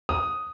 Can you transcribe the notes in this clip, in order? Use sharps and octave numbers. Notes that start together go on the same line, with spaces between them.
D#6